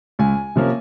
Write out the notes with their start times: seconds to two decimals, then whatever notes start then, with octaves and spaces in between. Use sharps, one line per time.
0.19 C#2 G#5
0.56 C3 F3 A#3 C#4